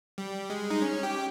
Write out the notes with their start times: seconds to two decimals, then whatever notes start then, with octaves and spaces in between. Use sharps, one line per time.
0.18 G3
0.50 G#3
0.70 D#4
0.82 C#4
1.03 G4